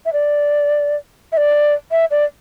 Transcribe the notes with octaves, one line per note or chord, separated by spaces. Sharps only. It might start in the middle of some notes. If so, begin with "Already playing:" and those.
E5
D5
E5
D5
E5
D5